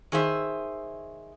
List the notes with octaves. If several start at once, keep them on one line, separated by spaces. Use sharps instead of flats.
D#3 G#4 C5 E5